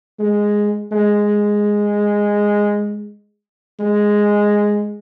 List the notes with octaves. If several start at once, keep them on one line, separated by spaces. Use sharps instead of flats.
G#3
G#3
G#3